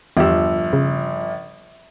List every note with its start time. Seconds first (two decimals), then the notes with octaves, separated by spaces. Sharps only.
0.17 G1 E2 F3 G4 E6
0.73 C#3